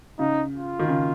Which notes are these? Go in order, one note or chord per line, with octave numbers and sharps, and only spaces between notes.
C#3 D#4
F4
D#3
C#3